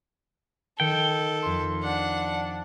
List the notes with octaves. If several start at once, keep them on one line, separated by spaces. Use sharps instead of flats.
D#3 A4 G5 C#7 D7
F2 C6
D4 F#5